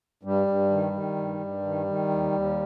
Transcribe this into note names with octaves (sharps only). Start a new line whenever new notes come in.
G2 G3
G2
D#3
D#3
G2
G2
D#3
D#3
D#2
D#2